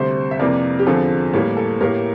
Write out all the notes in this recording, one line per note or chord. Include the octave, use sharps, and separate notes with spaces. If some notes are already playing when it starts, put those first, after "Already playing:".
Already playing: D2 C3 G3 C5 E5
E5
F2 C3 E3 A#3 A#4 D5
G4
E2 D3 F3 C4 A4
A2 E3 G3 A#3
A4
A2 E3 A#3 G4 A#4